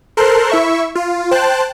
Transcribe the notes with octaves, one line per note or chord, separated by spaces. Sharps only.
A4 A#4 C5 C6 F#6
E4 E5 C#6
F4
C5 G5 A5 F#6